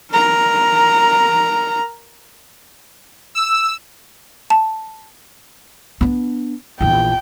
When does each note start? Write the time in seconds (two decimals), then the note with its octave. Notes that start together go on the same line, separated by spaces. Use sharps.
0.12 A#4 A#5
3.35 E6
4.50 A5
6.01 B3 D4
6.81 A#1 E2 G5